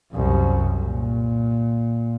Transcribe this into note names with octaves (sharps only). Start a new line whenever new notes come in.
C2 F#2
A#2